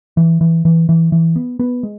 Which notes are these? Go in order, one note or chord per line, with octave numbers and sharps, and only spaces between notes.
E3
E3
E3
E3
E3
B3
B3
G#3